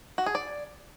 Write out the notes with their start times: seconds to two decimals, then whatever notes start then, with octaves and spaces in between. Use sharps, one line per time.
0.18 F#4
0.26 G#4
0.35 D5